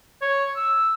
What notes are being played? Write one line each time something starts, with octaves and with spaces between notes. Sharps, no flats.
C#5
E6